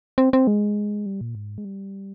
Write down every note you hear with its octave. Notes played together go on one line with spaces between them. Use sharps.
C4
C4
G#3
G3
A#2
G#2
G#3
G3